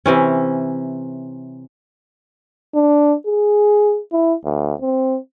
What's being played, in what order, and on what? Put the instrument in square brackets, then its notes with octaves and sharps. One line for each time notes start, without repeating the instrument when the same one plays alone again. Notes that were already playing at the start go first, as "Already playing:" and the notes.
[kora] C3 E3 C#4
[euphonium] D4
G#4
E4
D2
C4